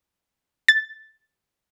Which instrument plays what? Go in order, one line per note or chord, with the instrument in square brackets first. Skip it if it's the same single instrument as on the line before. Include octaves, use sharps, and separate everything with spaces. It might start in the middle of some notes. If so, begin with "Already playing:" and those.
[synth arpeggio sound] A6